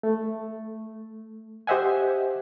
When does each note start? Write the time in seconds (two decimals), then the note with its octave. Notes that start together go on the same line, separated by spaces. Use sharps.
0.03 A3
1.67 G4 C5 D#5 E5 F#5 G#5